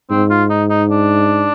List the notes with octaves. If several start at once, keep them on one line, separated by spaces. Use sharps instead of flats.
G#2 C4
F4
D#4
D#4
D4